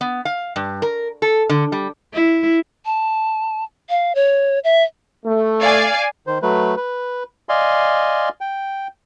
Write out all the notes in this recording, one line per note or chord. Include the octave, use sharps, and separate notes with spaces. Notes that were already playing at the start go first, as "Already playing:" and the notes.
B3
F5
G2
A#4
A4
D3
G3
E4
A5
F5
C#5
E5
A3
D5 F5 G#5
D#3 C5
F#3 A3 B4
B4
D5 D#5 F5 G#5 C6
G5